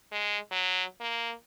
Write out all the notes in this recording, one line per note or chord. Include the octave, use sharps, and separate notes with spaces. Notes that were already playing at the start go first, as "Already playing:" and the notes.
G#3
F#3
A#3